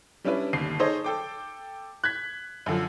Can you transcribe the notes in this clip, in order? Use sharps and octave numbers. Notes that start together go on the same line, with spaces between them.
G3 C#4 D4 E4 B4
G1 D#2 C7
D#4 G#4 A4 C5 C#5 D#5
A4 G5 D6
F#6 G#6 B6
F#2 D3 F3